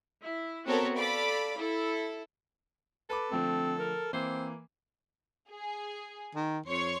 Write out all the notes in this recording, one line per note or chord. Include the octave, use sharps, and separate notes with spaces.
E4
B3 C4 F#4 A4 A#4 C#5
A4 D5 F5 B5 D6
E4 A4
A4 B4 B5 D6
D3 F3 A3 C4
A#4
E3 A#3 C4 C5
G#4
D#3
F2 C#5 C6 C#6